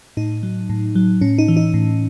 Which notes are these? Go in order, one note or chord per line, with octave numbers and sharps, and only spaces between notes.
A2 D#4
F#3
A2
F#3
A2 C#4
D#4
E3
D#4
A2